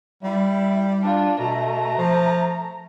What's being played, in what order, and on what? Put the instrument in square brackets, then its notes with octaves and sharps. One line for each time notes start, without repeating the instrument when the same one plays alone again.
[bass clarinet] G3 [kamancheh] E4
[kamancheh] D4 F4
[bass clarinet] B2 [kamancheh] A3 A#5
[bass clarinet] F3